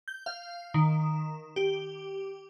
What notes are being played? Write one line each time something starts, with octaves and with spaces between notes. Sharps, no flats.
G6
F5
D#3
G4